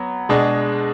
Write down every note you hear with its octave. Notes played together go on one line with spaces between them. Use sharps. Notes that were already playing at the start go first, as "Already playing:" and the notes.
Already playing: F#3 B3
B2 G#3 D4 G#4